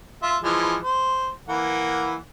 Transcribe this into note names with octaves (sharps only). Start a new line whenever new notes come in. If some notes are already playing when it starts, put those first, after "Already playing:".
F4 E5
E3 F3 G#3
C5
E3 A#3 F#5